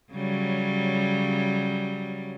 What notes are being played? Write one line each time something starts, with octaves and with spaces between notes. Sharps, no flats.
C#3 F#3 G3